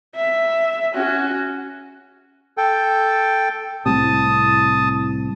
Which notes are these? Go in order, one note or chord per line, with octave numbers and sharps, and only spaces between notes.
E5
C#4 F#4
A4 G5
C2 A2 C3 A5 D#6